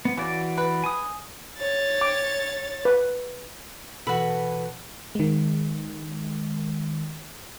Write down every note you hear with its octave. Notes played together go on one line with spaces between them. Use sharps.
B3
C#3 E3 F#4 D5
B4
G#5 D#6
C#5 A6
D6
B4
B2 E3 F#4 A4 B4 B5
D#3 G#3